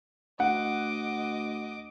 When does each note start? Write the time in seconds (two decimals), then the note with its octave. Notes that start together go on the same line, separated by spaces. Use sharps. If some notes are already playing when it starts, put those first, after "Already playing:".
0.40 D2 D#5 F#5 D6